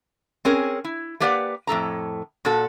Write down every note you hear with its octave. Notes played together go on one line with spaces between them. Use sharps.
C4 C#4 G#4 A#4
E4
A3 A#3 G4 B4 D5 F#5
F2 A2 A4 A#5
A#2 F#4 A4